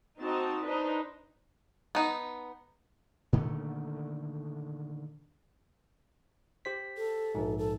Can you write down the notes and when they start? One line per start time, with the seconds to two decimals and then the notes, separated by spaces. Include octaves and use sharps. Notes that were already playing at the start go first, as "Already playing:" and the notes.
0.20 C4 D#4 F#4 A5
0.65 D4 D#4 B4 C5
1.95 B3 D#4
3.33 A#2 D3 D#3 A3
6.65 G4 C5 B6
6.97 A4
7.35 A#1 G#2
7.58 A4